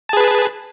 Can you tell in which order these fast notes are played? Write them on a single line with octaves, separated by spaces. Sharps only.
A5 G#4 B4